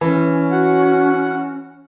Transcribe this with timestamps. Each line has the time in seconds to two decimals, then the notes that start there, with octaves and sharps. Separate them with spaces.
0.01 E3 C#4
0.51 F#4 F#5